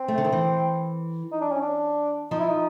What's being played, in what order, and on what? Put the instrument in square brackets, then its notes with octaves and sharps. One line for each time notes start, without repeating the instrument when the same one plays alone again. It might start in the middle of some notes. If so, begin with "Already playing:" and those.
Already playing: [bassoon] C4
[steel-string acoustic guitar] A3
D3
D#3
E3
[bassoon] D#4
D4
C#4
D4
[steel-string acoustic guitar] F3 [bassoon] D#4
[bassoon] E4
D#4